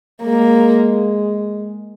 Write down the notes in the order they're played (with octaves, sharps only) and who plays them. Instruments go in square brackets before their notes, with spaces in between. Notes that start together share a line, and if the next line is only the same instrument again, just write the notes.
[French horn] G#3 [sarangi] A#3